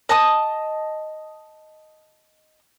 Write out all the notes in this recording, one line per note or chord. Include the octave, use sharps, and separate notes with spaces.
D#5 A5 D#6